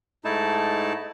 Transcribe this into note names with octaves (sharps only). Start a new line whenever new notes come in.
G#2 A3 D#4 E4 A5